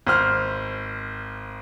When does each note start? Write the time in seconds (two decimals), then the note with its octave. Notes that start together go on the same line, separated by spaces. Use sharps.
0.07 G#1 C5 F6